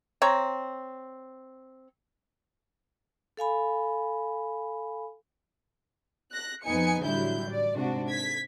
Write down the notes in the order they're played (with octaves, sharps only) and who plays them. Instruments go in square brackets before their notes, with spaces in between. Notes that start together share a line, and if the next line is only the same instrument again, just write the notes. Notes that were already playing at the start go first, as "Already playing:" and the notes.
[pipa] C4 C#5 A#5
[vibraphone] A4 F5 G#5 B5
[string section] F#6 A#6
F2 F3 B3 D#4 G#5 C#7
A1 D3 F#3 G3 E4 G6
A1 D5
G#2 C3 D4 F#4
G#6 B6